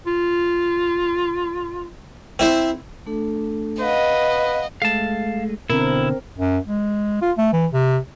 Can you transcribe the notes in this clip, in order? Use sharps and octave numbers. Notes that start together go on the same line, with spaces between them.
F4
C4 E4 C5
A3 D4 A4
B4 D#5 F5 F#5
G#3 A3 F5 A5
B2 D3 C4 E4 A#4
F#2
G#3
F4
A3
E3
C3